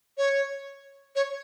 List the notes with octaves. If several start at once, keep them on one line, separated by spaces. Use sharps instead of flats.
C#5
C#5